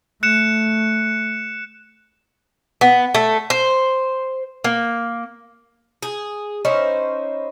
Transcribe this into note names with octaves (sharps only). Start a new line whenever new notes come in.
A3 F#6 C#7 E7
B3
A3
C5
A#3
G#4
C#4 D#4 E4 C5